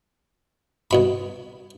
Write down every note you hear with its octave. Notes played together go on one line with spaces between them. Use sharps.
C2 B2 B5